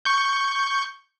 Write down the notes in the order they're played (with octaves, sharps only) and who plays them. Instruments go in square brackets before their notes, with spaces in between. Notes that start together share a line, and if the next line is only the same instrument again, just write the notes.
[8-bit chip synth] C#6 G6